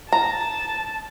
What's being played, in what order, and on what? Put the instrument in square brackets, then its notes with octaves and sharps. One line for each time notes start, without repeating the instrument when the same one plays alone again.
[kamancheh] A5 [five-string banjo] A#5